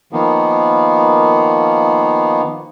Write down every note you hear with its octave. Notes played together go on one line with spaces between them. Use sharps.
D#3 F3 A#3 B3